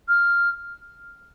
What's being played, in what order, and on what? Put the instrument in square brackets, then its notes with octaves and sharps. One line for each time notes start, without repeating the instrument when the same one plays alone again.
[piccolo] F6